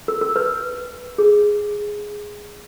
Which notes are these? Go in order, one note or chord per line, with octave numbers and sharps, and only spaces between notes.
A#4
A#4
B4
G#4